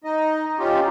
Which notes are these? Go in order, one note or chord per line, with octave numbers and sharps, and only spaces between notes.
D#4 D#5
C#4 D#4 F4 G4